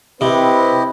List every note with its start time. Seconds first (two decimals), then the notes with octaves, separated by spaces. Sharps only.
0.21 C3 C4 E4 G4 B4 D#5